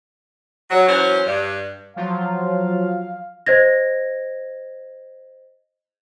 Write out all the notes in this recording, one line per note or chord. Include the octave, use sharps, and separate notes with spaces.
F#3
E3 F#3 C#4 C5
G2
F3 F#3 F4 F5
C5 D#5 G#6 A#6